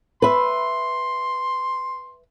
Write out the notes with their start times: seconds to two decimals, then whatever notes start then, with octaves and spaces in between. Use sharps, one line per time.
0.22 B4 E5 C6